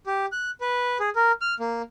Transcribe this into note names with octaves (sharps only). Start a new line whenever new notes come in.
G4
F#6
B4
G#4
A#4
F6
A#3